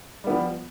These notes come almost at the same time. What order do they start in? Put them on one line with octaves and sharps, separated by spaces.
G3 B3 F3